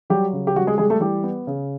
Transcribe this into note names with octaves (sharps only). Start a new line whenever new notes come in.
F#3 G3 G4
C#3
G4
G3 F#4
G#3 G#4
G3 G#3 G#4
A3 A4
E3 G3 G4
B3
C#3